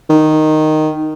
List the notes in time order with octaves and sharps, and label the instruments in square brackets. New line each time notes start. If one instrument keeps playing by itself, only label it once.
[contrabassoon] D#3